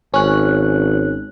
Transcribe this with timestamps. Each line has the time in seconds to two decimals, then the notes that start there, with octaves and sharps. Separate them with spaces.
0.14 G#1 C#4 F#6